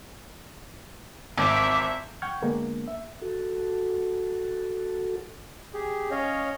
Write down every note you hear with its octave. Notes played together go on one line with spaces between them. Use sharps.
G#1 E5 D6
F#5 G5 C#6 F6 G6 G#6
D3 G#3 A#3 B3 D4
E5
F#4 A4
G4 G#4
C#4 C#5 D#5 F5